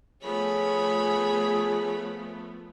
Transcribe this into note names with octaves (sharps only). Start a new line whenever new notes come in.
F3 A3 B3 G#4 C#5 B5